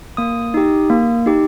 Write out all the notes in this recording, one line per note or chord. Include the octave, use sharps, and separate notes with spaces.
A#3 D#6
D#4 G4
A#3
D#4 G4